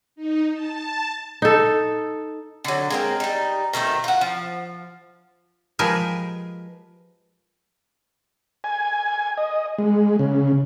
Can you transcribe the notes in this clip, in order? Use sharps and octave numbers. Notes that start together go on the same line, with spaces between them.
D#4
A5
D#4 A4
D3 F#3
G#3 A#3 C4
G3 D#4
B2 D#3 A3 C5
F4 F#5
F3
F3 G#3 G4 G#4 A#4 B4
G#5
D#5
G#3
C#3